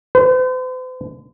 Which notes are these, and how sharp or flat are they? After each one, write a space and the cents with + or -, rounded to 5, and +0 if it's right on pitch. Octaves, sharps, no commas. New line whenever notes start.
C5 -45